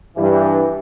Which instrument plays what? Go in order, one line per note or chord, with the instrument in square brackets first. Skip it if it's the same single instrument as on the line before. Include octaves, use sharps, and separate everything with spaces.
[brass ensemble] G2 E3